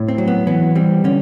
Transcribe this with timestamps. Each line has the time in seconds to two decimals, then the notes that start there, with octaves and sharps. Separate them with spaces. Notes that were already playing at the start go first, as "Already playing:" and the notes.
Already playing: A2
0.08 C4
0.18 F#3
0.27 B3
0.47 E3 B3
0.75 G3 C4
1.04 D3 C#4